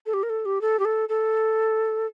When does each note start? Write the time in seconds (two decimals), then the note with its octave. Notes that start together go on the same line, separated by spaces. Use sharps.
0.06 A4
0.13 G4
0.23 A#4
0.29 A4
0.45 G4
0.61 A4
0.79 G4
0.85 A4
1.09 A4